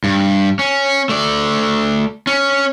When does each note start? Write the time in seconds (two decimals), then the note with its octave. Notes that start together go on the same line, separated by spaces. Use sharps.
0.04 G2
0.59 C#4
1.09 A3 D5
2.27 C#4